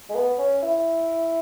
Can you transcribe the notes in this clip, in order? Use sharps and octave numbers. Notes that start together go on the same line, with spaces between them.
G#3
B3
C#4
E4